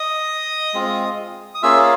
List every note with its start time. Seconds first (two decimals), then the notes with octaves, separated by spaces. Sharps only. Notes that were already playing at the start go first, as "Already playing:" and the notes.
Already playing: D#5 D#6
0.74 G#3 C4 F4
1.54 D#6
1.62 A#3 C#4 F4 G#4 E5 E6